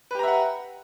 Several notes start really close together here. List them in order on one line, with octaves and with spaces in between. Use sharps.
B4 G4 A#5 E5 F#5